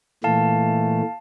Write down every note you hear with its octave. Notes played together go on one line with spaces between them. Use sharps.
A#2 E3 A3 F5 A5